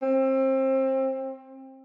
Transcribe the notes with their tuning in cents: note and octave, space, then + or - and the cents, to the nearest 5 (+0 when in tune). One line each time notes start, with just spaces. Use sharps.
C4 +25